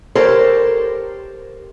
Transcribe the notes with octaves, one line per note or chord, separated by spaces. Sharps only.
G4 A4 A#4 C5 C#5